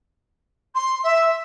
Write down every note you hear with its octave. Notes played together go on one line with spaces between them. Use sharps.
C6
E5